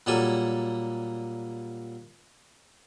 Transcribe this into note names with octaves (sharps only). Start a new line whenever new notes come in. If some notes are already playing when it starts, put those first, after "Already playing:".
A#2 F#3 G3 A#3 A4 G#5